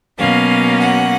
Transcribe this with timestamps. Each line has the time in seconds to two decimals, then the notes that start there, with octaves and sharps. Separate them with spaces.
0.18 B2 F#3 A#3 C#4 F5
0.79 F#5